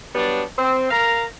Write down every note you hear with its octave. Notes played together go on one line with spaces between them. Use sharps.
F#3 G3 B3 D4
C4
A#4 F5 A#5